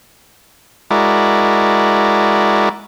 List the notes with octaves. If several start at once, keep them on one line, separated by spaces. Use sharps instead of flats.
G#3 E4 F#4 A#4 D5